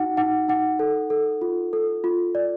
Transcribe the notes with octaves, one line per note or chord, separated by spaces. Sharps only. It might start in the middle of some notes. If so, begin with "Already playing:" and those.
Already playing: D#4 F#4 F#5
D#4 F#5
D#4 F#5
A4
A4
F4
A4
F4
D5